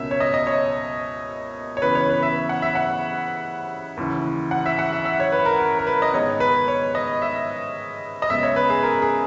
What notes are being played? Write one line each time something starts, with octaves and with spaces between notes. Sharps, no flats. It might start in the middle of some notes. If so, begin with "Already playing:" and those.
Already playing: C#2 B2 A#3 C#4 E5
C#5
D#5
D#5
C#5
C#5
F#2 C#3 E3 B3 B4
C#5
B4
E5
F#5
E5
F#5
D#2 C#3 E3
F#5
E5
F#5
E5
E5
C#5
B4
A#4
A#4
A#4
B4
D#5
G#2 D#3 G#3 B3 C#5
B4
C#5
D#5
E5
D#5
F#2 C#3 G#3 B3 E5
C#5
B4
G#4
A#4
G#4